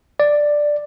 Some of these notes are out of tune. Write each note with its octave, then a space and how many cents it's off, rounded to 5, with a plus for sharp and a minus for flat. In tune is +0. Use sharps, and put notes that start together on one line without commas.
D5 +5